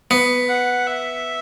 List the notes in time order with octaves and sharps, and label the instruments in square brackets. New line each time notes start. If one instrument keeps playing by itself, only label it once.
[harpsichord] B3
[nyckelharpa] F#5
E5